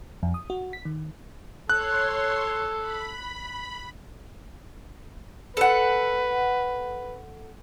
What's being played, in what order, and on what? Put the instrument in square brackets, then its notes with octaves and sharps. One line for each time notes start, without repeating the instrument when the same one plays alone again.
[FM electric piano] F2
D#6
F#4
B6
D#3
[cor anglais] A4 [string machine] C#5 C6 [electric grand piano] F#6
[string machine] B5
[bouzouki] A4 F#5 [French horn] B4